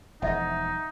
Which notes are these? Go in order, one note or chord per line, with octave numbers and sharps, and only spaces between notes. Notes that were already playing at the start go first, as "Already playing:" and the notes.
E1 F3 G3 D#4 D#5 E5 F#5